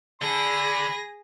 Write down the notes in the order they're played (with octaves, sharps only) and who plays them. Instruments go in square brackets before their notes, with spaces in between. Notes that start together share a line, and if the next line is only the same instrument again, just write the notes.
[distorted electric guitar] D3 D4 [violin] G#4 A#6 [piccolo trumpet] B5